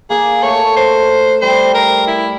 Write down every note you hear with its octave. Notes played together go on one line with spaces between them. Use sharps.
A#3 G#4
A3 C#5
C5
G3 C5
A#4
E4